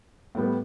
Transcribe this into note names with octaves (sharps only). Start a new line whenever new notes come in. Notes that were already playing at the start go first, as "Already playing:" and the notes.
A2 G3 B3